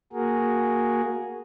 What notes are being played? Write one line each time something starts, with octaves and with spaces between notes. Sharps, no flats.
A#3 F#4 G#4 A#4